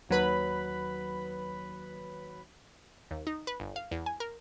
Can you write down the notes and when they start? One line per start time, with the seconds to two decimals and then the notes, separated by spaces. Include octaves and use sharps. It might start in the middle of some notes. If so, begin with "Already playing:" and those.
0.09 D#2 F#3 B4 B5
3.11 D#2
3.27 D#4
3.47 B4
3.60 G1
3.76 F5
3.91 E2
4.06 G#5
4.20 A#4